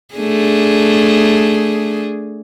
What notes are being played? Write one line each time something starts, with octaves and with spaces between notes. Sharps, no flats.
A3 D4 G#4